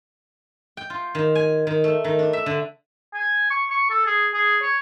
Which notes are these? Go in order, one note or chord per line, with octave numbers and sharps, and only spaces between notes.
G5
F4
D#3
G#5
D#3
A3
D#3
D4
E5
D3
G#5
C#6
C#6
A4
G#4
G#4
C#5